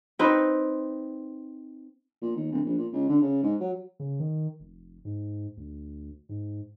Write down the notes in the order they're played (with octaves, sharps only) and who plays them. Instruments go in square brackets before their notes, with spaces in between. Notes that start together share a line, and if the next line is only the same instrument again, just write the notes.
[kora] C4 D#4 B4
[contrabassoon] A#2
D#2
D1
A#1
A#2
C#2
D3
C#3
G#2
F#3
[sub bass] C#3
D#3
F1
G#2
D2
G#2